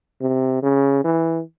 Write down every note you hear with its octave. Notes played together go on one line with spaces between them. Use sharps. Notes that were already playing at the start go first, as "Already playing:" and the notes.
C3
C#3
E3